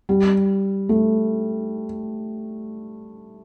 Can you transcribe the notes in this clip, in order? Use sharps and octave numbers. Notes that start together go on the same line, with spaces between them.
G3
A3